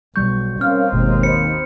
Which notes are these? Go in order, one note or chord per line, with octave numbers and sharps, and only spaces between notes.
B1 G3 C#6 G6
C4 C#4 D#4 A#4 F5 F6
G1 D#2 B2 G#3
C5 B5 C#7